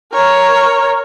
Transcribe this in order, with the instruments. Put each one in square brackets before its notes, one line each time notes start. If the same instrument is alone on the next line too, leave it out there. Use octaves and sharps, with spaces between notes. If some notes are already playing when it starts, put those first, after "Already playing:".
[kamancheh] A#4 C#5